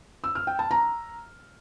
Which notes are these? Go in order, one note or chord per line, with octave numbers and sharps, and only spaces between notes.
E6
F6
G5
A5
A#5